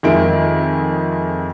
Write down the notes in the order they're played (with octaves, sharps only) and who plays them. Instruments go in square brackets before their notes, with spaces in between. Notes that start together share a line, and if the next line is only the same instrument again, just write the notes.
[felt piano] F2 D#3 G#3 E5 D7